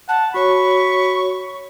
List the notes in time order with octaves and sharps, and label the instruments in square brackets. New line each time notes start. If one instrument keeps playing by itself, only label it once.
[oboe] F#5 [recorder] A5
[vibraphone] F#4 C#5 [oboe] B5 [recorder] C#6